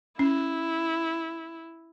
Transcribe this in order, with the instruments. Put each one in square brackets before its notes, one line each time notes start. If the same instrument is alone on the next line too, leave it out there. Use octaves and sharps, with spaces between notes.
[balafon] C#4 [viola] E4